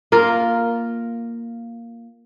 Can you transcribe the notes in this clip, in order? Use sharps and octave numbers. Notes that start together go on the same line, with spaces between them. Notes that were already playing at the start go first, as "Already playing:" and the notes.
A#3 F4 A#4